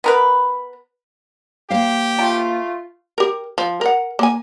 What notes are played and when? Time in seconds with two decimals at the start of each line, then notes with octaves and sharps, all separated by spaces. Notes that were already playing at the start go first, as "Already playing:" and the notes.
0.04 B3 A#4 B4
1.70 A#3 G4 C5 F5
2.19 A3 F4 G5 A5
3.18 G4 A#4
3.58 F3
3.81 A#4 F#5
4.19 A#3 G#5